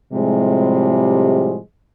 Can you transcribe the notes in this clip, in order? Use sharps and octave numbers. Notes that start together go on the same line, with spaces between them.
A2 C3 F3 G3 G#3